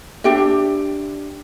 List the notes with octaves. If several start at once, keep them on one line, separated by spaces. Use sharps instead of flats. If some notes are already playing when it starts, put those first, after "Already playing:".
D4 G4 E5